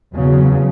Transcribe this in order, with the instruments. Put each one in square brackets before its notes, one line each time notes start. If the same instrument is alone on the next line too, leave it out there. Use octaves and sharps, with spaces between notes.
[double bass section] E2 C#3 F#3